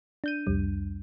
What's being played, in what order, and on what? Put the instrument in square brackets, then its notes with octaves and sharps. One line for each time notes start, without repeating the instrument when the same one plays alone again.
[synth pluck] D4 G6 D#7
C2 F2 G3